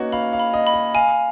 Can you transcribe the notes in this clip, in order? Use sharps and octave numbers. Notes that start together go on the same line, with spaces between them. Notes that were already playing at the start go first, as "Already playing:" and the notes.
Already playing: A#3 C#4 D#4 F#4 B4
F5 B5
F5
B5
D#5
B5
D#5
F5 G#5